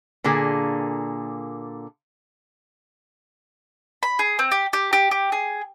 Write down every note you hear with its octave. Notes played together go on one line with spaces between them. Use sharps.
A#2 D3 A#3 G#4
B5
G#4
C4
G4
G4
G4
G4
G#4